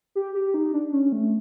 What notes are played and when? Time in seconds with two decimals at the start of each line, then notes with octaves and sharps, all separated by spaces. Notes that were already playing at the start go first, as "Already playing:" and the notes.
0.15 G4
0.35 G4
0.54 D#4
0.73 D4
0.93 C#4
1.12 A3